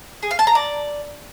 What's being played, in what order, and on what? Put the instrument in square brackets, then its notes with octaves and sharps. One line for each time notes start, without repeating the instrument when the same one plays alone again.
[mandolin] G#4
F5
A5
A#5
D5